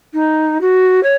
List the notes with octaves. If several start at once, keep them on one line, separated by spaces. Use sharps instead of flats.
D#4
F#4
C#5